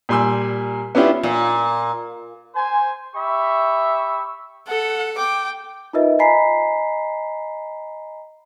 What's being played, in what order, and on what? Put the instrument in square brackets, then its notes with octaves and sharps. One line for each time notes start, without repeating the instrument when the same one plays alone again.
[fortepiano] A#2 G3 G#5 C6 E6
B3 C#4 D4 E4 F4 G4
[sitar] A#2
[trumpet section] C5 G#5
G4 E5 B5 C#6
[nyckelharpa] A4 [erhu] F#5
[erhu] G5 [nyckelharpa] D6
[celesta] D#4 F4 A#4 B4 D#5 E5
D#5 G#5 A#5 B5 B6 C7